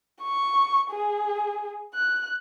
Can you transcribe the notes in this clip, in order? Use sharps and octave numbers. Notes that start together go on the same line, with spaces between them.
C#6
G#4
F#6